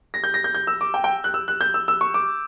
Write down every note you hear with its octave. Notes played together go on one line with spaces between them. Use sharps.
A#6
G6
A#6
G6
G6
E6
D6
G5
G5
F#6
E6
F#6
G6
E6
E6
C#6
D6